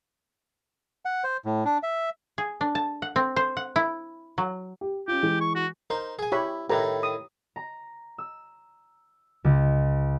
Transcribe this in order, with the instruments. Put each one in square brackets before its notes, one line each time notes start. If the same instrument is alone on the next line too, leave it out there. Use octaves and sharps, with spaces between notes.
[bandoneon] F#5
C5
A2
D4
E5
[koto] G#4
D4
A5
F#5
C4
C5
F#5
E4
F#3
[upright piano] G4
[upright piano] C#4 F4 [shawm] G4
[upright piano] E3 G#3
[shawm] C#6
F#4
[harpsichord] D#4 C5 [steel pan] A#4
[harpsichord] G#4 G#5
[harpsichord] E4 [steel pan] G4 C#5 B5
[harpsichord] A2 D#3 E4 [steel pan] G4 B4 A#5
[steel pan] D#6
[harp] A#5
E6
C#2